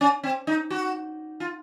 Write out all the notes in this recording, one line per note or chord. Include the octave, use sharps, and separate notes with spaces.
C#4
C4
D#4
F#4
F4